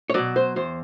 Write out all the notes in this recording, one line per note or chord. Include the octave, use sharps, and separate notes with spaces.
C#5
B2 F#3 D5
C5
E2 C5